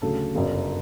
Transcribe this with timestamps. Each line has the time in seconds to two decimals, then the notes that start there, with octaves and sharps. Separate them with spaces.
0.02 D2 C#3 F#3 A4
0.35 G1 F#2 C#3